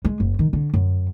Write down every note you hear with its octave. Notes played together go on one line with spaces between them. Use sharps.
G#3
F#1
D#3
D3
F#2